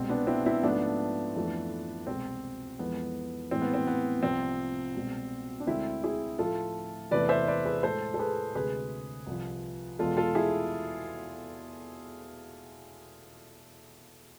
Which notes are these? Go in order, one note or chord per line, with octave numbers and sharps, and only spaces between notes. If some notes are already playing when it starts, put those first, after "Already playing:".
Already playing: C2 B2 G#3 C4
B3 D4
C4 E4
C4 E4
G#2 F3 A3 B3 D4
F2 E3 A3
C2 B2 G#3 C4
F2 E3 G#3 B3
A2 E3 G#3 C4
B3
C4
B3
C2 C3 F3 C4
C2 B2 G#3
D4
D2 D3 G#3 C4 E4
E4 G#4
A2 F3 A3 F4 A4
E2 C3 E3 A3 B4 D5
C5 E5
B4 D5
G#4 B4
A2 G#3 A4 C5
A4
G#4 B4
D2 C3 G#3 G#4 B4
C2 C3 F3
E2 B2 G#3 F4 A4
F4 A4
E4 G#4